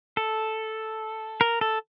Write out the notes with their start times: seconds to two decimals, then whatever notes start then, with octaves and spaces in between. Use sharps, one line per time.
0.17 A4
1.41 A#4
1.61 A4